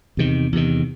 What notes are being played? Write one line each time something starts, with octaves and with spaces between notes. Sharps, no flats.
E2 C3 D#3
E2 C3 D#3